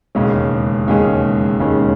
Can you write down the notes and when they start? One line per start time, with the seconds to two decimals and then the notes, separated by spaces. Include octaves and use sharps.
0.15 E1 D#2 C#3 G#3 C#4
0.87 E1 D#2 C#3 G#3 C#4
1.59 E1 D#2 C#3 G#3 C#4